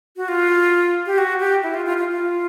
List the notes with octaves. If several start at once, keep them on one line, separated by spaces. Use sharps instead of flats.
F#4
F4
G4
F#4
G4
E4
F4
F4
F4
F4